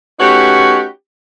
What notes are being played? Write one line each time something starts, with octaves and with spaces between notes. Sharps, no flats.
A3 C#4 D#4 F#4 G4 B4